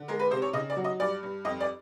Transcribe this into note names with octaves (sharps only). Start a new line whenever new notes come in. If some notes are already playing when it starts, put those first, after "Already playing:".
Already playing: D3
G#3 A#4
B4
C3 C5
C#5
C#3 D#5
D5
F#3
D#5
G2 D5
G2
F2 D#5
D5